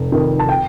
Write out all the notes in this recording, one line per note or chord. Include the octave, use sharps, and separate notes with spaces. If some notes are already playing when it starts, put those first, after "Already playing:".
Already playing: F1
F2 D#3
A5
G5